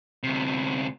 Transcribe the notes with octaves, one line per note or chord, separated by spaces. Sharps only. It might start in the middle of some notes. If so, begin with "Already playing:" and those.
D2 C3